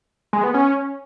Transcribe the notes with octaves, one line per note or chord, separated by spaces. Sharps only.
G#3
B3
C#4